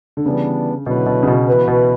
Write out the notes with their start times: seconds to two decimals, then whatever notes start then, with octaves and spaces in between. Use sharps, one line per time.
0.17 D3
0.26 C#3 E3 G3 B3 D4
0.86 B2 D3 F#3 B3 E4 B4
1.06 B2
1.23 C#3
1.27 B2
1.48 E3 B3 F#4 B4
1.68 B2